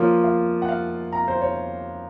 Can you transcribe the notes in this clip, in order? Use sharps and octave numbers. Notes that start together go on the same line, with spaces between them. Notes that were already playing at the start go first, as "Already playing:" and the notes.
Already playing: F3 A#3 F4 C#5
F5
F#5
F5
A#5
C5
C#5